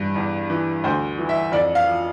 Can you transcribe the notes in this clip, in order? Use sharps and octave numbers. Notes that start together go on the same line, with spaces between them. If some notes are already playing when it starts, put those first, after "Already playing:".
Already playing: G2 E3
E2
E3
D2 C5
E3
E5
F2 D5
F5
F3